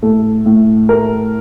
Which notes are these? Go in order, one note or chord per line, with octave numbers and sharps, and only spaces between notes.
A2 A4
A2
A3 A#4